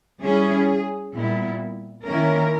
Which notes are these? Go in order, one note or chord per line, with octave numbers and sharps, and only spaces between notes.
G3 C#4 E4 G#4
A#2 G3 B3 E4
D#3 A#3 C#4 E4 A#4